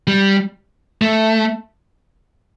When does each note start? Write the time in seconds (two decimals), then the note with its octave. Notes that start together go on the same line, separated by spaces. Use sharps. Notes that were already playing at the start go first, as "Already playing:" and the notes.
0.07 G3
1.02 A3